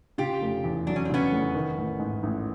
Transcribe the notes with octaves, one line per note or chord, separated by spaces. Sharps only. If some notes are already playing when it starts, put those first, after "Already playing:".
C#3 F4 G4
F1
E2
F#3 D4
C#4
C4
C#3 B3 C#4
F1
D#3
A1
G#2
A1